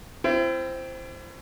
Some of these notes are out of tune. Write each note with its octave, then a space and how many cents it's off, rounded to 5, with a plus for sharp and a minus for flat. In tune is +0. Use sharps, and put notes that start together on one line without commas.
C4 +0 E4 +40